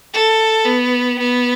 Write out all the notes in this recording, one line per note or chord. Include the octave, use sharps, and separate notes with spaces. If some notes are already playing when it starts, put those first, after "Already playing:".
A4
B3
B3